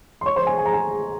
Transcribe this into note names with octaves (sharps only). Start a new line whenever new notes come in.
C6
C#5 C#6
C5 C6
G#4 G#5
G#5
A#5
G#4 G#5